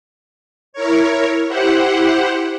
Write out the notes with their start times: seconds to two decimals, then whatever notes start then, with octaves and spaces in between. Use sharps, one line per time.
0.73 E4 A#4 C#5
1.48 E4 G4 C5 F#5